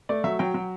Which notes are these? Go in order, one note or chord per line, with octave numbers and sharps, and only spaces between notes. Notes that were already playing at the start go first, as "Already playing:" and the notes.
A3 D5
F#3 E5
F#3 G5
F#3